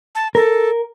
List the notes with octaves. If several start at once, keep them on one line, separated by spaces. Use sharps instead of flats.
A5
A4 A#4